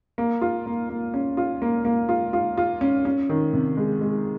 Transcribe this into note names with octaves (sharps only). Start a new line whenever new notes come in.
A#3
F4
A#3
A#3
C#4
F4
A#3
A#3
F4
F4
F4
C#4
C#4
D#3
C3
G#3
G#3